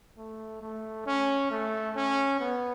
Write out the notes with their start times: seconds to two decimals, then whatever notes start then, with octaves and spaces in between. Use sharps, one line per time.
0.17 A3
0.62 A3
1.06 C#4
1.50 A3
1.95 C#4
2.40 B3